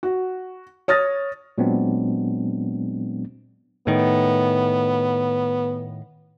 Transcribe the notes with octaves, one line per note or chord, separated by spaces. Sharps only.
F#4
C#5 D#6 F6 A6 A#6
A#2 F#3 G#3 B3 C4 D4
A2 D#3 B3